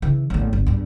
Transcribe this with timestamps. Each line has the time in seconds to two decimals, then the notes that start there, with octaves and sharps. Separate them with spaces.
0.02 C#3 E3
0.30 A1 E2
0.53 G1
0.67 E2 G2